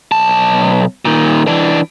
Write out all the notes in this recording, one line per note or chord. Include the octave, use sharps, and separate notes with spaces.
B1 A5
A#2 D#3
E3 D4